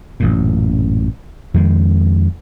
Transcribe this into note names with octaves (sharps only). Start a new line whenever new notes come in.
A1 F#2 A#2
F2 D#3 G#3